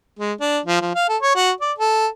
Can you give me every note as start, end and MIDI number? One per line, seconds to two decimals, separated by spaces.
0.19 0.33 56
0.41 0.59 62
0.66 0.81 53
0.81 0.90 53
0.95 1.07 77
1.09 1.17 69
1.22 1.34 73
1.35 1.51 66
1.61 1.72 74
1.78 2.07 69